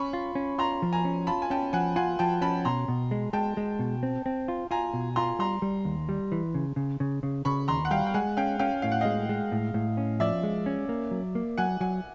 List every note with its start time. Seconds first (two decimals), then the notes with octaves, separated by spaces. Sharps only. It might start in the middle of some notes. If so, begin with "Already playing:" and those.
Already playing: C#4 B5 C#6
0.13 F4
0.35 C#4
0.58 F4 A#5 C6
0.82 F3
0.93 G#5 A#5
1.05 C#4
1.27 F4 A5 B5
1.42 G#5
1.50 C#4 G5 A5
1.73 F3 F#5 G#5
1.96 F4 F#5 G#5
2.19 F3 G5 A5
2.41 C#4 A5 B5
2.65 B2 A#5 C6
2.88 B2
3.11 G#3
3.33 G#3 G5 A5
3.57 G#3
3.79 B2
4.03 C4
4.26 C4
4.48 F4
4.71 F4 G#5 A#5
4.93 B2
5.16 F4 A#5 C6
5.39 G3 A#5 C6
5.62 G3
5.85 D#2
6.09 G3
6.32 E3
6.54 C#3
6.76 C#3
7.00 C#3
7.23 C#3
7.45 C#3 B5 C#6
7.68 D#2 A#5 C6
7.85 F#5
7.91 G3 F5 G5
8.07 G5
8.14 G#3 F#5 G#5
8.37 C#4 F5 G5
8.59 C#4 F5 G5
8.82 A2 F5
8.92 F#5
9.01 G#3 D#5 F5
9.29 G#3
9.52 A2
9.74 A2
9.97 C#4
10.20 F3 D5 E5
10.43 G#3
10.66 C#4
10.89 A#3
11.11 F#3
11.35 A#3
11.58 F#3 F#5 G#5
11.80 F#3 F#5 G#5